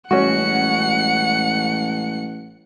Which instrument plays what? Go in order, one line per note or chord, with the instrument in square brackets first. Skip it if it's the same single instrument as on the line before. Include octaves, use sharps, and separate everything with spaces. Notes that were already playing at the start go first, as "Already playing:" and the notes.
[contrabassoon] A1 [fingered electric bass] G3 G#3 [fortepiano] C#4 F#4 [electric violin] F#5 C#7